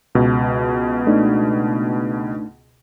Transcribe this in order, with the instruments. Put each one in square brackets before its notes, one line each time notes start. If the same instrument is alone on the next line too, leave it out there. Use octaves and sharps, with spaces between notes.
[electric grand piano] C#2 B2
[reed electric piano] A3 D4 D#4